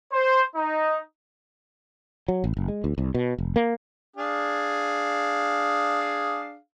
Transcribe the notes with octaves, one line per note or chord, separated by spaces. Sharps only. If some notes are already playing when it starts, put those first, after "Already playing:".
C5
D#4
F#3
A1
F#1
G#3
D2
C2
B2
F1
A#3
D4 G#4 F5